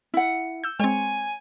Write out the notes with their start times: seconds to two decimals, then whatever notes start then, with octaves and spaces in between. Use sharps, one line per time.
0.14 E4 F#5
0.64 E6 G6
0.80 G#3 C4 C#5 G#5